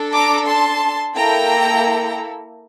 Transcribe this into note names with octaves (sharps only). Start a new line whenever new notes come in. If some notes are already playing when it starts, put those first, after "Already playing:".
Already playing: D4 A4
A#5 D6
A5 C6
A#3 E4 A4 G5 A#5